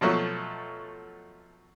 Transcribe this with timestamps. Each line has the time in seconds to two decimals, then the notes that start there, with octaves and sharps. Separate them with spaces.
0.01 B2 F3 F#3 A3